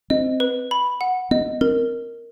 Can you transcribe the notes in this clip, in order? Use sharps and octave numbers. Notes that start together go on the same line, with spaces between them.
C4 D#5
B4
B5
F#5
B3 D#5
C4 A#4